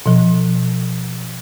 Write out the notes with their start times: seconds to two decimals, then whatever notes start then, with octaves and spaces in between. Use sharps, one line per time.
0.06 B2 F3